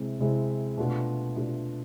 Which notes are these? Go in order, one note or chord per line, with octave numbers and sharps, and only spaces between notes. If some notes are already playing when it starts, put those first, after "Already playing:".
Already playing: C3 G#3 C4 E4
C3 G#3 C4 E4
B2 A3 D4 F4
B2 A3 D4 F4